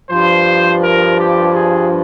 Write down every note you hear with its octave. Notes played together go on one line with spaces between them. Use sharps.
G2 F3 C5
A#4
G4
G#4